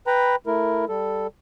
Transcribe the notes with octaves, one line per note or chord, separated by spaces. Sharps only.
B4 G5 A#5 B5
A3 E4 A#4
G3 A4